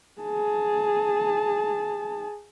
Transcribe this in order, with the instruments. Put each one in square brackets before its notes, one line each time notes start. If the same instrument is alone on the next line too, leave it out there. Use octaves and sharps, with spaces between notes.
[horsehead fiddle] G#4 A5